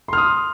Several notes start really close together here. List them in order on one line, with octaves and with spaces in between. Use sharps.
C6 F6 D#6